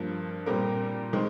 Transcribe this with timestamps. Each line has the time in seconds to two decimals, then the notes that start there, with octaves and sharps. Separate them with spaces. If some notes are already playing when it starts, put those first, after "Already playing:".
Already playing: G2 F3 A#3
0.46 A#2 G3 C4 G4 A#4
1.13 D#3 G#3 C4